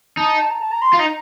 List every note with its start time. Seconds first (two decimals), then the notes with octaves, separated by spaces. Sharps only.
0.17 D#4 A5
0.50 A#5
0.61 A5
0.71 A#5
0.82 C6
0.93 F4
0.98 D#4 A#5